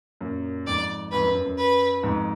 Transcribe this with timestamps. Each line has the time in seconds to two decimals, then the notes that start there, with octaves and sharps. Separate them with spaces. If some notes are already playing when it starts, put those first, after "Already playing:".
0.21 F#2 A#2
0.67 F2 G#2 D5
1.12 F2 G#2 B4
1.23 F#2
1.35 F#2
1.46 F#2
1.57 B4
2.03 F2 G#2